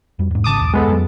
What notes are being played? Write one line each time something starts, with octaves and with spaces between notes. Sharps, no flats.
F2 G3
E2 G#2
G#1 C#3 A5 D6 D#6
B1 E2
G#3 B3 A4
F2 F#3